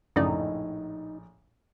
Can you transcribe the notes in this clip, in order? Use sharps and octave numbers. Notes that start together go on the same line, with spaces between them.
A#1 F#2 A2 C#3 D#4 D5